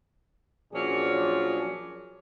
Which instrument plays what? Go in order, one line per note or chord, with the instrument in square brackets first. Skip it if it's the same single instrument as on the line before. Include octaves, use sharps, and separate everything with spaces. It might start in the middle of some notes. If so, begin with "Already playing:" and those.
[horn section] A#2 F3 F#3 C#4 D4 G#4